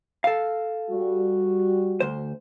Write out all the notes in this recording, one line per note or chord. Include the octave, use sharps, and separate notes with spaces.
A4 F5
G3 F#4
D2 C5